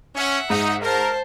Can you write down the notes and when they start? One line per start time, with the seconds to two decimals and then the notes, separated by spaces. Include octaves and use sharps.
0.16 C#4 E5 F#5
0.50 G#2 D#4
0.82 A#4 C5 A5